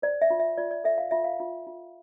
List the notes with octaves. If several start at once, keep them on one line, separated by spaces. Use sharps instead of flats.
C5 D5
E5
F4
E5
F4 D5
D5
A4 E5
F5
F4 E5
F5
F4
F4